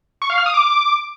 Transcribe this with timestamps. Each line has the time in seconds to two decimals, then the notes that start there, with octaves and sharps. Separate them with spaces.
0.22 C#6
0.30 F5
0.38 F6
0.46 D#6
0.54 D6